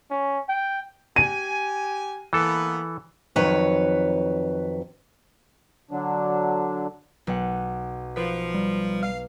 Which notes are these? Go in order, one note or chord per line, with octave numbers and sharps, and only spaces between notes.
C#4
G5
G4 G#5 D#7
E3 A#3 B3 A4
F2 D#3 F#3 B4 C#5
D3 F#3 D4
B1 F#5
F3 B4
G3
F5